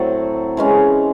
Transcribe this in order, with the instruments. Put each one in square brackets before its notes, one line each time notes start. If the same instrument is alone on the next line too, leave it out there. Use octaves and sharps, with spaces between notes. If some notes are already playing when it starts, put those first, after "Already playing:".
Already playing: [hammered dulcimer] A2 F#3 C4 A4
E3 G#3 C#4